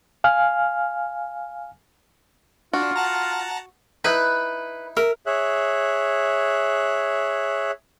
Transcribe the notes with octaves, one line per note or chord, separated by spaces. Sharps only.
F5 G#5 F6
D4 F4 F#4
F#5 A5 A#5
D#4 E4 B4
A#4 E5
G#4 C#5 E5 F#6